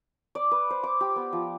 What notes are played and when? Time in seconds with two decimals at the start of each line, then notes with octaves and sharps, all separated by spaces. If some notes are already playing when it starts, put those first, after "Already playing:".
0.35 D5
0.51 B4
0.70 C5
0.83 D6
1.01 G4
1.16 B3
1.33 F3